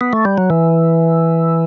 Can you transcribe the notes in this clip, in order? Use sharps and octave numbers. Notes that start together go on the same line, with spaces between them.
B3
A3
G3
F#3
E3